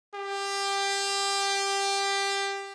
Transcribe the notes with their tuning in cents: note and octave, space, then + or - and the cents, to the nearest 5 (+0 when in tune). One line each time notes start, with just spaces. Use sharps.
G4 +15